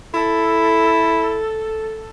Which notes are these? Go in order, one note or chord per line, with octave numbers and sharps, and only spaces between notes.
E4 A4